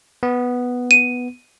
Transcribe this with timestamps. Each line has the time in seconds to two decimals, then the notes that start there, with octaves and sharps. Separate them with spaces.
0.23 B3
0.91 D#7